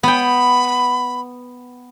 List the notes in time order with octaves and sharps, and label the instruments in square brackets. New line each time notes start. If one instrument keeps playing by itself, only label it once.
[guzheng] B3 G5 [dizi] B5